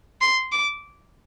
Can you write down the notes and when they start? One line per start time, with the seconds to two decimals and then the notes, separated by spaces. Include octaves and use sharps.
0.21 C6
0.52 D6